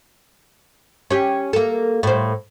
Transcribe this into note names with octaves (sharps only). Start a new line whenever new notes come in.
C#4 G4
A#3 A4
A2 C5